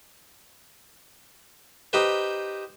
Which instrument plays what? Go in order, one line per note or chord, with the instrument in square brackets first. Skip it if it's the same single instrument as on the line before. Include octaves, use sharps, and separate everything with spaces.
[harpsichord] D#4 G4 B4 C5